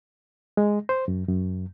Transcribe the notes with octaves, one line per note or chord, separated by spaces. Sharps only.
G#3
C5
F#2
F#2